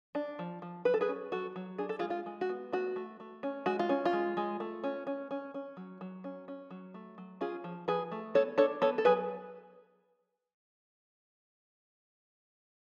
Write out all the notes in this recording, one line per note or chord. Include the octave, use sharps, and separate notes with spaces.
D4
F3
F3
F#3 B4
A4
G#4 B4
C#4
F#3 F#4 A4
F#3
D4 G#4
A4
F4 G#4
G#3
F4
G#3
F#4
B3
A3 F#4
A3
A3
C#4
G#3 F#4
F4
C#4
F4
G#3
G#3
A3
C#4
C#4
C#4
C#4
F#3
F#3
C#4
C#4
F#3
A3
F#3
C#4 F4 G#4
F3
F3 G#4 B4
A3
B3 A4 C#5
D4 A4 C#5
B3 A4 C#5
A4
F#3 G#4 B4